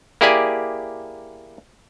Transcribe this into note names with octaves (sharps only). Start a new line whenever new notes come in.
A#3 E4 G4 G#4 D5 G#5